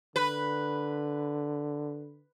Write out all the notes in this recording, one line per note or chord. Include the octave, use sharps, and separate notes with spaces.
D3 B4